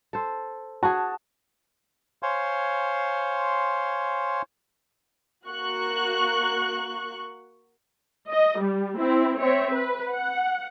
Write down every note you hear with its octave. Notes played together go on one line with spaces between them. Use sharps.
A4 C5
F#4 G#4 A5
C5 C#5 F5 G#5 C6
A#3 F#4 C#6 F#6
D#5
G3
C4 E4
C4 C#5 E5
B4
F#5